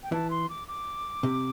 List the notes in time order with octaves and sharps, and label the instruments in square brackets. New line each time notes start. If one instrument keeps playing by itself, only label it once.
[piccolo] G5
[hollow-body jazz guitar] E3 [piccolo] A5
[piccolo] C6
D6
D6
[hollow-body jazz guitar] C3